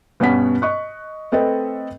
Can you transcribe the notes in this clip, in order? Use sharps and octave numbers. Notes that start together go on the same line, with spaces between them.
G2 B2 B3 C#4 F#5 B6
D#5 C#6 F#6
A3 C4 A4 B4 D#5